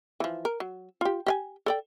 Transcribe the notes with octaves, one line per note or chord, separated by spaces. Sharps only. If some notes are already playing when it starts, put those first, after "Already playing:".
E3 F3
A#4
F#3
F4 G4
G4 F5 G#5
A4 D5 G5